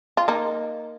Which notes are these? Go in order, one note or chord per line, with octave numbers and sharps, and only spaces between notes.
F4
A#3 D#4